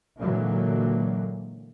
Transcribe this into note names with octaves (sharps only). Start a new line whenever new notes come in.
A#2 D3 E3 F#3 G#3 A#3